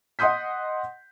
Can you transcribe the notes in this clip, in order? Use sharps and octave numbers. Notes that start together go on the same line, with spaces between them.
D#5 F#5 C6 D#6 G6 B6